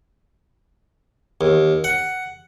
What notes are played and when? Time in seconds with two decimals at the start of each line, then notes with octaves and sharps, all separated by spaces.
1.41 D#2
1.84 F#5